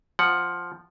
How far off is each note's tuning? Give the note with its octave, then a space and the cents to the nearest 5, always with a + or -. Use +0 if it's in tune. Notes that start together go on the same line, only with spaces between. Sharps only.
F3 +0 F#5 +0